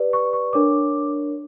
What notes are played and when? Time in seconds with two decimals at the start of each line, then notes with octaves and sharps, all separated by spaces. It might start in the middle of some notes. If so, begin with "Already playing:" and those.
Already playing: G4 B4 D5
0.13 C#6
0.33 C#6
0.53 D4 A#4 C#5 D6